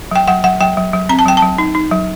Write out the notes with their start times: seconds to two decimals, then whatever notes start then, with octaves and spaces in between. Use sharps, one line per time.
0.11 F#3 G5
0.28 F#3 F#5
0.44 F#3 F#5
0.61 F#3 G5
0.77 F#3
0.93 F#3
1.09 C4 A#5
1.19 A5
1.26 F#3 G5
1.37 F#3 A5
1.58 D#4
1.75 D#4
1.91 F#3